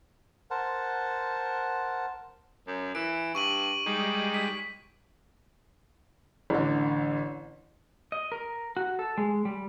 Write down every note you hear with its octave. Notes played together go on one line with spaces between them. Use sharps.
A#4 C5 F#5 A5
F#2
E3 D7
G2 C#6 D#7 F#7
G3 G#3 D#4
B6
A1 D3
D#5
A#4
F#4
A4
G#3
G3